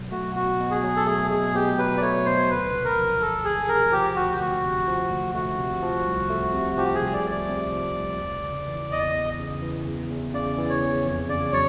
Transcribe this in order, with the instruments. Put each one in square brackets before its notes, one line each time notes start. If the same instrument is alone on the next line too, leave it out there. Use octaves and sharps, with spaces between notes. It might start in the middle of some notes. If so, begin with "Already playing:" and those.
Already playing: [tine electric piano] B2 F#3
[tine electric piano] A3 [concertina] F#4
[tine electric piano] B2 [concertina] F#4
[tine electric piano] B2
[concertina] G#4
[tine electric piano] F#3
[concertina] A4
[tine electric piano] A3 [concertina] G#4
[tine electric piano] B2 [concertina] G#4
[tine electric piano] B2 [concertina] G4
[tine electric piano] F#3 [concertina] B4
[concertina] D5
[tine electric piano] A3 [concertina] C#5
[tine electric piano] B2 [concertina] C5
[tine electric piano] D2 [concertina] B4
[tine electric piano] C3
[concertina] A#4
[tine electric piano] F3
[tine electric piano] D2 [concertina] A4
[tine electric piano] D2 [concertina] G#4
[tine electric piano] C3 [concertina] A#4
[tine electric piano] F3 [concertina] G4
[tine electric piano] D2 [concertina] F#4
[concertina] G4
[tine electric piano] D2 [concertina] F#4
[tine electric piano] C3
F3
D2
[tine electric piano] A3 [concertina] F#4
[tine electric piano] C3
F3
C2
A3
C3
[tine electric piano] F3 [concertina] G4
[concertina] G#4
[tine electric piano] C2
[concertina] D5
[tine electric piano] A3
[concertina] D5
[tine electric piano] C3
F3
C2
E2
C#3
E3
[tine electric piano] E2 [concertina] D#5
[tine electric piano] E2
C#3
E3
E2
E2
[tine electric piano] C#3 [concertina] D5
[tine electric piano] E3
[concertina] C#5
[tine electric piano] E2
F2
[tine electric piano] C#3 [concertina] D5
[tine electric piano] F#3 [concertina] C#5